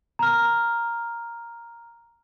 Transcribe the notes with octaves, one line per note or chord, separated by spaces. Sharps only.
A#5 F6